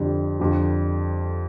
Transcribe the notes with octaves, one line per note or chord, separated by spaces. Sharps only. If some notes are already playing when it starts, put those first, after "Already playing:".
Already playing: F2 D3 G3
F2 D3 G3